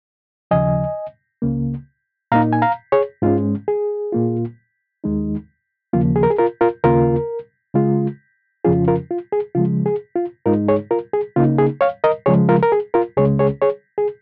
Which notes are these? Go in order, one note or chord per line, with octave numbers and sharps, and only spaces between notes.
D#2 C#3 F3 D#5 G#5
C#2 C#3 A#3
A#2 A#3 D#4 F5 A#5
G#5
F5 A#5
G#4 C#5
G#2 G#3 C#4 F4
G#4
A#2 A#3 F4
D#2 D#3 G#3 D#4
D#2 C#3 F3 A#3 F4
G#4
A#4
G#4
F4 A#4
F4 A#4
D#2 C#3 A#3 F4 A#4
C#3 G#3 F4
F2 C#3 F3 C#4 F4 G#4
F4 A#4
F4
G#4
C#3 F3 G#3 F4
G#4
F4
G#2 G#3 D#4 F4 A#4
G#4 C#5
F4 A#4
G#4
C#3 A#3 D#4 F4
G#4
C#5 F5
A#4 D#5
C#3 F3 G#3 G#4 C#5
F4 A#4
A#4
G#4
F4 A#4
C#2 C#3 G#3 C#4 G#4 C#5
G#4 C#5
G#4 C#5
G#4